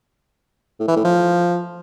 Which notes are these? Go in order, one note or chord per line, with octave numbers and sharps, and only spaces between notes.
A2
E3
A2
F3